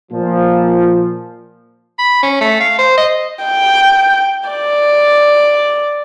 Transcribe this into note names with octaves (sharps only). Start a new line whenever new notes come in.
A#2 F3
B5
C#4
A3
F5
C5
D#5
G5
D5